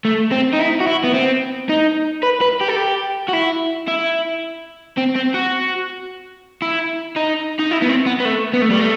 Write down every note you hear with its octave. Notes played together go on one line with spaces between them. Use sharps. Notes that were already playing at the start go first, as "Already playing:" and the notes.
A3
C4
D#4
E4
F#4
E4
B3
C4
D#4
B4
B4
G4
A4
G4
F#4
E4
E4
C4
C4
F#4
E4
D#4
D#4
E4
B3
C4
B3
B3
A3
B3
A3
G3
A3